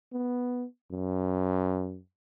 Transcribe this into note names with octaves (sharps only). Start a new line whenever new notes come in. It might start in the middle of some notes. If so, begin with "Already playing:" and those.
B3
F#2